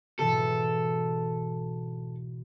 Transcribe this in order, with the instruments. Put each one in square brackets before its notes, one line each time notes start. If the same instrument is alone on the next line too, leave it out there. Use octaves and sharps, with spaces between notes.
[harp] G#2 B2 E3 [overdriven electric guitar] A4